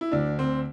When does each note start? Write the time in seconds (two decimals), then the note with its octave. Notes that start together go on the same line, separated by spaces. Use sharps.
0.01 E4
0.12 D2 D4
0.39 D2 C4